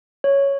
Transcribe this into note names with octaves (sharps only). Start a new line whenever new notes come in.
C#5